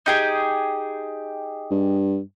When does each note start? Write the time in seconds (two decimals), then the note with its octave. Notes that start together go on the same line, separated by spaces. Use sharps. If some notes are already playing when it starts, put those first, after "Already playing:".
0.06 D#4 G4 G#4
1.71 G2